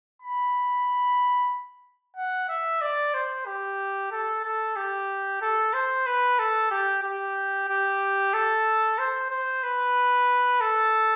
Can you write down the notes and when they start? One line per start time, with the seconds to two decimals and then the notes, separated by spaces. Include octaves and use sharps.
0.22 B5
2.16 F#5
2.48 E5
2.81 D5
3.14 C5
3.46 G4
4.12 A4
4.44 A4
4.76 G4
5.42 A4
5.73 C5
6.06 B4
6.39 A4
6.71 G4
7.03 G4
7.68 G4
8.33 A4
8.98 C5
9.30 C5
9.63 B4
10.60 A4